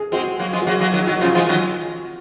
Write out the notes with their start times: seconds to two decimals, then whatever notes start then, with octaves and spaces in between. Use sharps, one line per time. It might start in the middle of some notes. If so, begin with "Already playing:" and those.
Already playing: G#4
0.12 G#3 C4 F#4
0.39 F#3 A#3
0.53 F3 G#3
0.62 F#4
0.66 F#3 A#3 G#4
0.80 F#3 A#3
0.93 D#3 F#3 F#4
1.07 D#3 F#3 F#4
1.21 C#3 F3 F4
1.34 F3 G#3 F#4
1.49 D#3 F#3